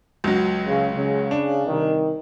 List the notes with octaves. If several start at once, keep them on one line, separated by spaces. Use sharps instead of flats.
C#2 F#3
C#3
C#3
D4
C2 D#3